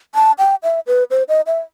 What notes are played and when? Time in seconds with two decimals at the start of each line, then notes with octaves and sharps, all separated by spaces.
0.15 A5
0.38 G5
0.63 E5
0.87 B4
1.11 C5
1.29 D#5
1.47 E5